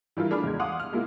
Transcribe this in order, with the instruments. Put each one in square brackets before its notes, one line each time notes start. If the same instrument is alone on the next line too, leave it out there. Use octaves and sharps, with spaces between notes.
[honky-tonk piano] E3 G3 E4 F4 A#4
A3 D4 G#4 B5 F6
E2 G#3 G#6
F5 F#5 C6 D6 D#6
F6
G#3 A#3 E4 F4